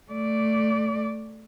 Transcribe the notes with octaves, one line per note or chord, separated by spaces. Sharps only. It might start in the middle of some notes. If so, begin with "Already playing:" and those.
A3 D5